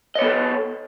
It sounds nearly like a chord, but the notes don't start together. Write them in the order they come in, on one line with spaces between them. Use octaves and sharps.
D#5 C#5 B3 A4